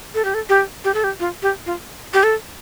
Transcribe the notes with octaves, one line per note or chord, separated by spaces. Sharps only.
A4
G4
A4
G4
G4
A4
G4
F4
G4
F4
G4
A4